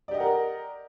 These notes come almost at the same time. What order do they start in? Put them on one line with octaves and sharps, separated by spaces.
D5 G4 D#5 F#5 A#4